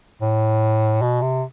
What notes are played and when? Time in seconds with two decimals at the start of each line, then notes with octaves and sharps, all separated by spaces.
0.22 A2
1.02 B2
1.22 C3